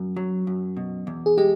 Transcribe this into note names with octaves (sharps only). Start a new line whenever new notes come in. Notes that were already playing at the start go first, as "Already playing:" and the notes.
Already playing: F#2
F#3
F#2
B2
E2
G#4
G#3 G4